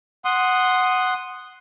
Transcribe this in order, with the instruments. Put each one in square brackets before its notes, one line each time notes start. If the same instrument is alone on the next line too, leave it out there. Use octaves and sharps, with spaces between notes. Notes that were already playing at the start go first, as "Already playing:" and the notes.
[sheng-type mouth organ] F#5 C6 D#6